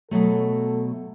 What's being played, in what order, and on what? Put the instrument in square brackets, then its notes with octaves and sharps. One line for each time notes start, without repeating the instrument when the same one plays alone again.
[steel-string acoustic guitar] B2 F#3 A3 [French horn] A4